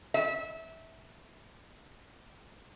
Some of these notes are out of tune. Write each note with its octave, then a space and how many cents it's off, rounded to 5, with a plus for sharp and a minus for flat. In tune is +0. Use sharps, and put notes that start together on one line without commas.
E5 -20